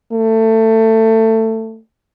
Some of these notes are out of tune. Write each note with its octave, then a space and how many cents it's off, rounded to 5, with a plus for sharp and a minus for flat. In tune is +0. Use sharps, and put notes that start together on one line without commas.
A3 +20